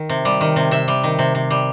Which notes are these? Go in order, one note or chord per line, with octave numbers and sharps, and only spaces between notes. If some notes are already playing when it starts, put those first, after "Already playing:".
Already playing: D#3
C3
G3
D#3
C3
C3 E5
G3
D#3
C3
C3
G3